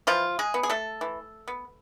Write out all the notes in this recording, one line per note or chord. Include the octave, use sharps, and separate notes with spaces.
E3 F3 F4
G#3 G#4
B3
G#4
A3 A4
E3
B3